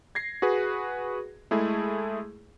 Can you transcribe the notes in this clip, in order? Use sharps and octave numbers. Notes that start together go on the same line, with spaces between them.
G#6 A#6 C7
F#4 G#4 B4
G#3 A3 E4 G#4